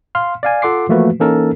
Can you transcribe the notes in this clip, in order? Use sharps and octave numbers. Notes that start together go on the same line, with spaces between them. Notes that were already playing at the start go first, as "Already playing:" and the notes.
F5 C6 F6
D5 F5 G#5
F4 A4 F#5 C6 D6 C7
E3 F3 A3 A#3 F#4 B4
E3 A#3 C#4 D#4 A4 A#4